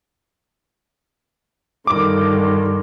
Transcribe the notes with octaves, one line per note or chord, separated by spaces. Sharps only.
G2 D3 D#3 D6